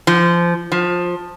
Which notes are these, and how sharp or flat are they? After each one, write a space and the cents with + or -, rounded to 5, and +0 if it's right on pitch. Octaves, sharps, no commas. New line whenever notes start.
F3 -20
F3 +15